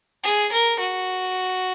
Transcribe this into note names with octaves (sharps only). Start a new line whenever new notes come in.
G#4
A#4
F#4